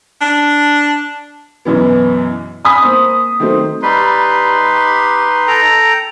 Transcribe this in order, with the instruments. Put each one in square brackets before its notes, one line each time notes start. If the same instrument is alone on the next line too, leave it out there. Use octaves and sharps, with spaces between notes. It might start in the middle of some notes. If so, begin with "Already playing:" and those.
[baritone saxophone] D4
[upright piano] F#2 B2 E3 B3
G#5 B5 D#6 B6
A#3 C4 C5
D#3 F#3 A3 C4
[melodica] G3 [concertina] D#4 B4 C6
[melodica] G4
A4 G5 A#5